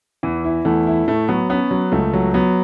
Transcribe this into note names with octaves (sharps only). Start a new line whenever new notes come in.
E2 E3
E4
E2 A3
E4
A2 A3
F#3 B3
B3 C#4
F#3
C#2 A3
F#3
F#3 B3